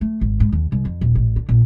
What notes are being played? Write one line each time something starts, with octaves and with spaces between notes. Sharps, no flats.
A3
G#1
G#2
D#2
C2
F2
D#1
A1
D3
A#1